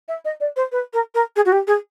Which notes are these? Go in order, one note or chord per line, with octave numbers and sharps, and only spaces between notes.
E5
D#5
D5
C5
B4
A#4
A#4
G#4
F#4
G4
G#4